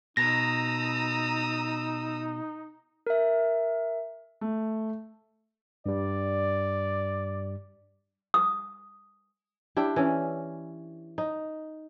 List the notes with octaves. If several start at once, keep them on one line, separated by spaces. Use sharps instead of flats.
B2 D#4 A#5 D#6 E6 A#6
A#4 E5
A3
G2 G3 D5
D#6
D4 E4 G4
E3 C#4
D#4